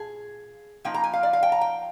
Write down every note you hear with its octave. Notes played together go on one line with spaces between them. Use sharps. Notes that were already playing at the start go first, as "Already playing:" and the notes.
Already playing: A#2 G#4
F3 A#3 D#4 G5
A#5
G#5
F5
D5
F5
G5
A#5
G5